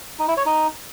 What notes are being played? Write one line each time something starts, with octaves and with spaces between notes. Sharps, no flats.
D#4
E4
C#5
D#4